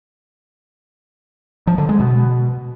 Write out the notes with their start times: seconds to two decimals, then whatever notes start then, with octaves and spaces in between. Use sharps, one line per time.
1.67 F3
1.78 D3
1.89 G#3
2.00 B2